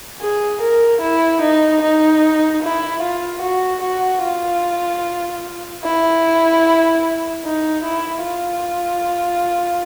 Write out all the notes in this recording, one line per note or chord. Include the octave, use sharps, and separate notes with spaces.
G#4
A#4
E4
D#4
D#4
E4
F4
F#4
F#4
F4
E4
D#4
E4
F4